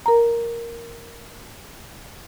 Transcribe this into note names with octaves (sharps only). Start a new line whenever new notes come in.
A#4 A#5